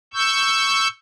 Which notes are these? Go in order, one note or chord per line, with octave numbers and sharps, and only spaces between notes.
C#6 E6 G6